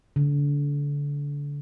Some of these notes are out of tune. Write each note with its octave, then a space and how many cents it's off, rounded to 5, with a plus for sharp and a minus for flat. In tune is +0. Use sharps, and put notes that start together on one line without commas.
D3 -30